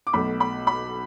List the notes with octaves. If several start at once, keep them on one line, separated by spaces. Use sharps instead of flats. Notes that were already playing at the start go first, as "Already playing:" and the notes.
D6
B1 B2 A3 B5
B5
B5